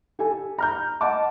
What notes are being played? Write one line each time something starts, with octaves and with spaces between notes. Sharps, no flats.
G4 A4 G#5
A#5 F6 G6
D#5 F#5 A5 D6